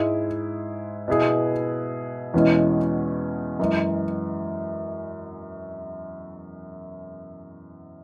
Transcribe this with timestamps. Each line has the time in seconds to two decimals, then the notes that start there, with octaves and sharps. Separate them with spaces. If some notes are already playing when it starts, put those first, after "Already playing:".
Already playing: G#2 G#3 E4 G#4
1.08 B2 B3 E4 G#4
2.34 E2 B2 G#3 C#4 E4
3.60 F#2 E3 G#3